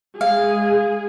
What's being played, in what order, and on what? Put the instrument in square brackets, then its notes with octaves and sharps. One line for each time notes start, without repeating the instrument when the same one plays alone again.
[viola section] G#3 G#4 [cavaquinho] F5